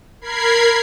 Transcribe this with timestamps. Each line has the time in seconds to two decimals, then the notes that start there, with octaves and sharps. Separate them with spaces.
0.21 A#4 B5 G#6 C7